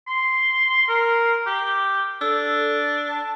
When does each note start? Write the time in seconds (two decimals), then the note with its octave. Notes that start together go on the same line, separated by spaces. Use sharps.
0.07 C6
0.88 A#4
1.46 G4
2.21 D4 A4 E6
3.09 A5